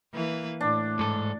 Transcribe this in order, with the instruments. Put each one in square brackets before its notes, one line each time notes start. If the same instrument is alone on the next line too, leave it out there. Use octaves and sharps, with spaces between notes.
[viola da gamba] E3 A#3 B4
[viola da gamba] A2 [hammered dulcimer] D4
[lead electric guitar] G#2 A4